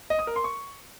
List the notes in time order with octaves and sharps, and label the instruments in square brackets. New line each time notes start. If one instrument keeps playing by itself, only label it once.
[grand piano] D#5
D#6
A#4
C6
C#6